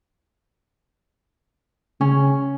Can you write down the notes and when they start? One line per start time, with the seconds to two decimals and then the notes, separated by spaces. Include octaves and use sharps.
2.01 C#3 C#4